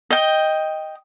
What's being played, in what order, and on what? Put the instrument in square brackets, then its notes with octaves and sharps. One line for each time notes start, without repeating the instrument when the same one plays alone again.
[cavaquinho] D#5 G5